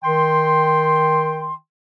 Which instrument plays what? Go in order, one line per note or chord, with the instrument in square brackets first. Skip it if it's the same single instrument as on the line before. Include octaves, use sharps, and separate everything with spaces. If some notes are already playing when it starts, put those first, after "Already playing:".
[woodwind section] D#3 G5 C6